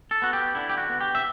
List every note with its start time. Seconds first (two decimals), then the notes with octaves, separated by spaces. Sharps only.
0.11 A4
0.22 B3 F#4
0.33 G4
0.55 D3 E4
0.69 G4
0.78 F#4
0.89 B3
1.01 G4
1.15 E5